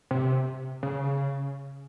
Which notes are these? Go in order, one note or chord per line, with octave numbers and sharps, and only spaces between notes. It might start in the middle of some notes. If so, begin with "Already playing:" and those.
C3
C#3